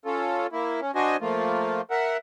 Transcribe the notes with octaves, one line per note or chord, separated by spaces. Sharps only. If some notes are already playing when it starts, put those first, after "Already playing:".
C#4 F4 A4
A#3 E4
C#4
D4 F#4 C5 D#5 G#5
F3 A3 A#3 F4
A#4 E5 F#5